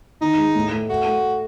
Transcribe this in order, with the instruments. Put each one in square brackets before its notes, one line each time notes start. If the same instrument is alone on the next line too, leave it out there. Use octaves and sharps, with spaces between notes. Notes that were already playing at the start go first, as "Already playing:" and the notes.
[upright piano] D#3 [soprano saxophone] D#4
[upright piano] G#3
A2
A3
[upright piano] A3 [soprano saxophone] F#4
[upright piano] A3